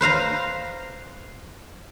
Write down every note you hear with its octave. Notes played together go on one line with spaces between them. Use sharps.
B4 C5 F5 A#5